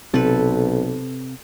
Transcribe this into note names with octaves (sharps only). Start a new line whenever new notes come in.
B1 C3 C4 A4 B4